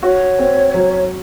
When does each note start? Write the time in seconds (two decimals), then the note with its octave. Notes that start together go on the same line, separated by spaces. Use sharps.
0.03 F#4 C#5
0.39 C4
0.74 F#3